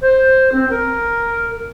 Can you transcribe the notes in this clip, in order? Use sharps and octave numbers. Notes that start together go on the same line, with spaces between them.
C5
C4
A#4